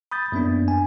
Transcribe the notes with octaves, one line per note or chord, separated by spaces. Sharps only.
B5 D#6 G6 A6
F#2 A#3 B3 D4
G#5